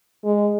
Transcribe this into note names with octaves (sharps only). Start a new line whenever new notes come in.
G#3